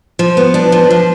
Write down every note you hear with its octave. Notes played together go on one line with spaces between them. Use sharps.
F3
B3
D4
F3
F3